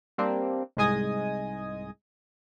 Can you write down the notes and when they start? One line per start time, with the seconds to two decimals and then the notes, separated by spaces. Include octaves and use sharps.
0.18 G3 A#3 C4 D4
0.77 C2 G#2 G#3 D#5 G#5 D#6